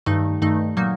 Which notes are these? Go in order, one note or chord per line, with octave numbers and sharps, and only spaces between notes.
G2 D#3 A3 D#4
G2 D#3 A3 D#4
A#2 F#3 A#3 D#4